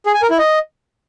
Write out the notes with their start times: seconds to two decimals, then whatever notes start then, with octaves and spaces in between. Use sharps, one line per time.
0.06 G#4
0.14 G#5
0.22 A#4
0.30 E4
0.38 D#5